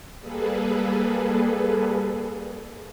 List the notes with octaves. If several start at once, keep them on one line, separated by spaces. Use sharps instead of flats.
G3 A#3 G#4 A4 B4